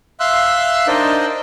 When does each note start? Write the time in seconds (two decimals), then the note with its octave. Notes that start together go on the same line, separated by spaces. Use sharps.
0.20 E5 F5 C6 E6 F#6
0.87 D4 D#4 A#4 C5 D5 D#5